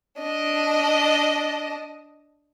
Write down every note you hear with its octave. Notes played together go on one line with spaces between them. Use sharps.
D4 D#5